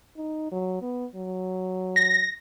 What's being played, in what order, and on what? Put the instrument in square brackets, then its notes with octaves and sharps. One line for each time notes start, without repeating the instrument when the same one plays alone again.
[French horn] D#4
F#3
B3
F#3
[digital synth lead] A#6